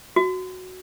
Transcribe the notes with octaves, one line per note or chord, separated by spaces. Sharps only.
F#4